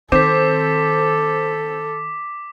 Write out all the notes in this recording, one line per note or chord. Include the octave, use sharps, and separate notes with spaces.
D#3 C4 A4 D6 B6